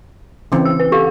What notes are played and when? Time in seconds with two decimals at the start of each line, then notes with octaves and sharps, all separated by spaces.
0.52 C#3 E3 C4
0.65 E6
0.80 B4
0.92 G4 A4 F5